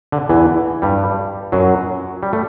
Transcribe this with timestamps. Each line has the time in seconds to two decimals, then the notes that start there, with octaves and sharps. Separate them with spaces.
0.12 D3
0.29 E2 E3
0.82 G2 G3
1.52 F#2 F#3
2.23 G3
2.33 A3